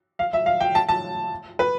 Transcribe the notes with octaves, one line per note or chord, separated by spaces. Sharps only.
F5
E5
F5
G5
A5
A5
B4